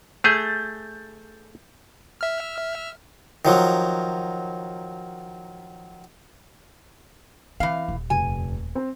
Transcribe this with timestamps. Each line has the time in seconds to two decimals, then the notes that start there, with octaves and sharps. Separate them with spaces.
0.24 A3 G#4 G6 A6
2.21 E5 F6
3.45 D#3 F3 F#3
7.60 E3 C4 F5
7.88 D#1
8.10 F1 G#5
8.75 C4 C5